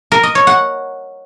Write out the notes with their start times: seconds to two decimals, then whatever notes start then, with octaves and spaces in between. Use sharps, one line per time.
0.12 A#4
0.23 D#5
0.35 C#5
0.47 F#5